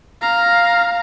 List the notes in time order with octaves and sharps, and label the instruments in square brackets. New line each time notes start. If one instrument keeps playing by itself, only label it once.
[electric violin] F5 A#5